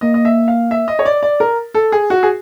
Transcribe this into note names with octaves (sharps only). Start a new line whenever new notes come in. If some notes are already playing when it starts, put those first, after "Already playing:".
A#3 D#5
D#5
E5
F5
E5
D#5
C#5
D5
D5
A#4
A4
G#4
F#4
G#4